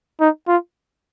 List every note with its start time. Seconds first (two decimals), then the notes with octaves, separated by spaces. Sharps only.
0.21 D#4
0.48 F4